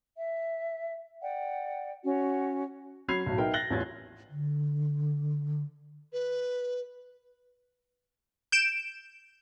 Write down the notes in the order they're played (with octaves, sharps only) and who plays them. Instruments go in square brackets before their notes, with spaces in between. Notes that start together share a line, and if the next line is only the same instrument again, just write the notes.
[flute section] E5
D5 F#5 G5
C#4 F#4
[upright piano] F#3 C#4 B5 G#6 C7 F7
B1 A2 F#3
B3 D#4 A#4 E5 G5
F#6 A6 A#6 F#7 G7
A1 E2 C#4 F4 G#6 A6
[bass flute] D3
[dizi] B4
[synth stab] G6 D7 E7